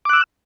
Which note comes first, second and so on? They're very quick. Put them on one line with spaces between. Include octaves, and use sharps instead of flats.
D6 F#6 E6